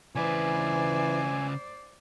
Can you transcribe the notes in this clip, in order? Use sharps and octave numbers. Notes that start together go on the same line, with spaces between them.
C#3 E3 B4 C5 D5 G#5